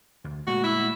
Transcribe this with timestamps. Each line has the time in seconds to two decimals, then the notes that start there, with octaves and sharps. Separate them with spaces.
0.24 D2
0.47 A#2 G#3 A3 F#4
0.64 E4